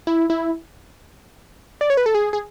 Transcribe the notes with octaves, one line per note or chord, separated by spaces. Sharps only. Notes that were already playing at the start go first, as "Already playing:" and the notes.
E4
E4
D5
C#5
B4
A4
G#4
G#4